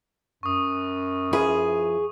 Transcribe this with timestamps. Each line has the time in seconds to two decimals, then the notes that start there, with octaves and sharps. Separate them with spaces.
0.43 F#2 C#6 D#6
1.33 F3 E4 G#4 B4